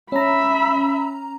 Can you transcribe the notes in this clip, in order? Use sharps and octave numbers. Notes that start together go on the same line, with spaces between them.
C#4 E5 A#5 B5